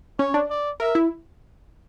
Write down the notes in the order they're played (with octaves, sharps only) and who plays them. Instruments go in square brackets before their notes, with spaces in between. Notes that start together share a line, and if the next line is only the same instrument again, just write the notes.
[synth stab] C#4 [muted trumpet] C#5
[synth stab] D4
[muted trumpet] D5
[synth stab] A#4 [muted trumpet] E5
[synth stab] E4